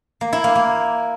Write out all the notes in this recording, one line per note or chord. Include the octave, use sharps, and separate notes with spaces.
A#3
E4
A#3
A#3